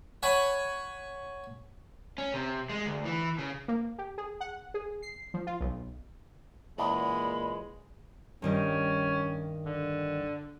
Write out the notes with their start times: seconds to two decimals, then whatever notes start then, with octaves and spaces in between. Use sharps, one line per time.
0.23 C#5 F#5 G#5 B5 C#6
2.18 C#4
2.34 C3
2.70 G#3
2.86 D2
3.05 E3
3.38 C#3
3.68 A#3
3.98 G4
4.18 G#4
4.41 F#5
4.74 G#4
5.02 C7
5.34 F3
5.47 F4
5.61 B1
6.78 E2 A#2 C#3 G#3 D#5 B5
8.42 G2 D#3 G3 C#4
9.65 D3